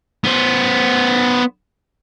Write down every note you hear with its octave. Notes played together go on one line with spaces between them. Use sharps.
B3 C5